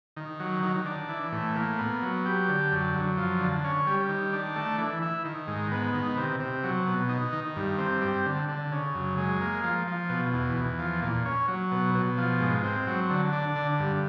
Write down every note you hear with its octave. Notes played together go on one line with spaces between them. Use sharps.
D#3
F#3
D#3
D4
E3
A2
A#3
B3
F#3
G4
D3
F#2
F#2
F3
D3
C#4
G3
D#3
D4
A3
E3
E4
D#3
G#2
B3
D#3
C3
C3
F#3
B2
D#4
D#3
G2
C4
G3
D3
D3
C#3
F#2
G#3
A#3
F3
F3
B2
E2
E2
F3
A#2
C#4
F#3
B2
B2
F3
G#2
C4
F#3
D3
D4
D3
G2